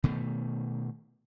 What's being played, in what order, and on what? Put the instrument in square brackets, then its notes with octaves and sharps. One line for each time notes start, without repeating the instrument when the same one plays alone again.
[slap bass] B2 D#3 A3